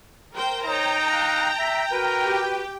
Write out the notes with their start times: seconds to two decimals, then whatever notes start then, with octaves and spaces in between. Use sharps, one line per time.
0.33 A#4 C5 G5
0.65 D#4 C#5 G5 A#5
1.11 F5 F6 F#6
1.59 E5
1.92 F#4 A#4 B4
2.26 G4